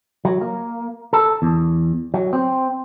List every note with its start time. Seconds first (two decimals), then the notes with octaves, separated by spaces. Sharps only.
0.25 F#3
0.41 A#3
1.13 A4
1.42 E2
2.14 F#3
2.33 C4